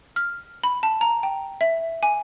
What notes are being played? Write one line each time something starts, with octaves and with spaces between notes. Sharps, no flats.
F6
B5
A5
A#5
G5
E5
G#5